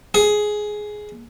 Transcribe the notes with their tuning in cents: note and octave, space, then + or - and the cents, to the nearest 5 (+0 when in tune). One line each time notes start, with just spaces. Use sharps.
G#4 +10